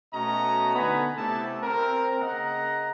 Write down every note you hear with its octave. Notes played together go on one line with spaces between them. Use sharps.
B2 A3 C#4 F#4 D#5 A#5
D3 B3 D#4 G#5 B5
C3 A3 E4 G4 A4 A5
C4 A#4
C#3 A#3 D#5 F#5 A#5